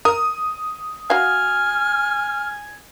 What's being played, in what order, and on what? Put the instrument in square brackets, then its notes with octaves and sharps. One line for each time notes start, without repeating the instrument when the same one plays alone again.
[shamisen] A#4 [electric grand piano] D#6
[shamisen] F#4 F5 [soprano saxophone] G#5 [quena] F6